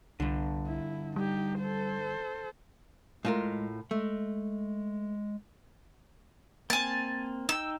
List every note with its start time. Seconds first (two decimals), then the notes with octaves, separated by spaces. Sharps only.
0.20 C2 G2 D3
0.67 E4
1.16 G3 D#4 G4
1.60 A4 C5
3.25 A2 G#3 F4 A#4
3.91 G#3 A3
6.70 A#3 C4 G#5 A5
7.49 D#4 G5 E6